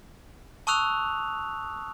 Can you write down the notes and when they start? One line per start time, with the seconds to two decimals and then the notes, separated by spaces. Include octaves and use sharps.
0.67 A5 C#6 D#6 E6 F#6 F7